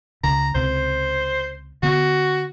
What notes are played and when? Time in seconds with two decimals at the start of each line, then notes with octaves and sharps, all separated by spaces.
0.23 C#2 C#3 A#5
0.55 C#2 C3 C5
1.83 D3 B3 F#4